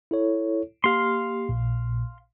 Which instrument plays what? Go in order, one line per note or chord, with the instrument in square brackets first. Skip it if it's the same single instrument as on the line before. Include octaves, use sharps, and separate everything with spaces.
[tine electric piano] E4 A4 C#5
[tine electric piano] A#3 G4 [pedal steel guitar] F5 C6
[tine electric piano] A#1 A#2